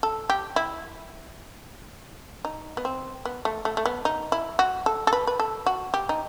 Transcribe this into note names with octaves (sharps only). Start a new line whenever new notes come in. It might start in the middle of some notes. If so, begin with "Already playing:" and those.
A4
G4
E4
D#4
B3
C4
B3
A3
A3
A3
B3
D#4
E4
F#4
A4
A4
B4
B4
A4
F#4
G4
D#4